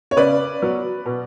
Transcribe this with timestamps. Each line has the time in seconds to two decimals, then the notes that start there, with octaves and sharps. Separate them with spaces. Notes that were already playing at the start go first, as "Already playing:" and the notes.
0.11 C#5
0.17 C#3 B4 D5
0.62 F#3 B3
1.06 B2